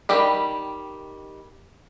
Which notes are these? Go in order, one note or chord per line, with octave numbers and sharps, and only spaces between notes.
D#3 G3 G4 B5